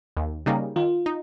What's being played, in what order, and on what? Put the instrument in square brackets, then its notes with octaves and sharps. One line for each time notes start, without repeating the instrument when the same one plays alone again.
[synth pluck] D#2
C#3 G3 A#3 D#4
[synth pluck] D#3 [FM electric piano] F4
[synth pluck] D#4